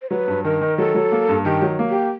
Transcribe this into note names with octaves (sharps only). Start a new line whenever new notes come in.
C5
F#3 B4
G2
D#3 A#4
D#3
F#3 A4
F#3
A#3
G2
D#3 G4
F#3
A#3
G4